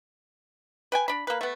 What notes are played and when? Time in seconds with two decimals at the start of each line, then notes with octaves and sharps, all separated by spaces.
0.92 B4 G5 G#5
1.08 D4 B5
1.27 A#3 B4
1.41 A3 B3